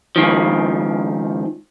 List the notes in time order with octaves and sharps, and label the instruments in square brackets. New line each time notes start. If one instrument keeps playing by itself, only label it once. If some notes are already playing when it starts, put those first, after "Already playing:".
[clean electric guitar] C#2 D#3 F3